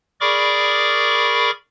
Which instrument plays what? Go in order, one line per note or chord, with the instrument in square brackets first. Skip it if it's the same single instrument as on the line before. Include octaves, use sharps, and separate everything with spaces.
[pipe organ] G#4 A#4 D5 B5 C#6 D6